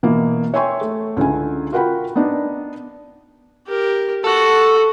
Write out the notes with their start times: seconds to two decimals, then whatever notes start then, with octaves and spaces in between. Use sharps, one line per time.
0.03 B2 E3 A#3
0.54 C#5 E5 G5 G#5 C6 C#6
0.81 A3
1.17 C#2 D3 E4 G#5
1.72 F4 F#4 A#4 F#5 G5 B5
2.16 B3 D4 D#4
3.67 G4 A#4
4.24 F#4 A4 F#5